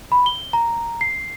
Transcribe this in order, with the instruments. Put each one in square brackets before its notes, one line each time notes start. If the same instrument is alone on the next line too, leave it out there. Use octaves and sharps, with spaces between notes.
[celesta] B5
G7
A#5
C7